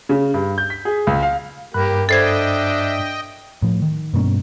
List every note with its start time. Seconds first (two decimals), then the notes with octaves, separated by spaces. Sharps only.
0.09 C#3
0.34 G2
0.58 G6
0.70 B6
0.85 G#4
1.07 C#2
1.22 F5
1.74 G2 A#3 G4 B5 F#6
2.09 D4 A4 C5 D#5 E5 G5 G#6
3.62 A2 F3
3.82 D#3
4.14 G2 B2 A#3 C#4